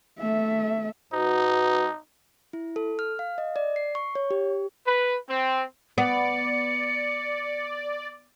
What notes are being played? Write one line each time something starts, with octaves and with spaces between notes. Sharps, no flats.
A3 E5
G#2 D#4 F#4 B4
E4
A4
F6
F5
D#5
D5
C7
C#6
C#5
G4
B4
C4
B3 D5 C#7